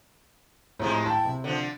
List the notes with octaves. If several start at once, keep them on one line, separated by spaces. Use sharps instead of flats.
A2 C3 F3 G#3
E4 G5 A5
C3
D3 F3